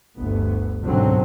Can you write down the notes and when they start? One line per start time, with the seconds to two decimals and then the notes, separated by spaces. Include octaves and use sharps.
0.16 G1 D2 B3
0.81 C#2 G#2 B2 D3 F#3 C4